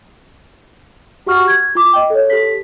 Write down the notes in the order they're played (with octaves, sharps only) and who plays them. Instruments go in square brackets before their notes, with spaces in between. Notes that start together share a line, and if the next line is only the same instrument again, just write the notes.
[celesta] F#4 G4 F#5 C#6 F6
G#6
F4 D6
D#5 G5
A4 C#5
G4 A4 B6